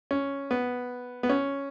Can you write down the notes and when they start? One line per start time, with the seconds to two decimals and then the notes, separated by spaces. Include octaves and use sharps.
0.11 C#4
0.51 B3
1.23 B3
1.29 C#4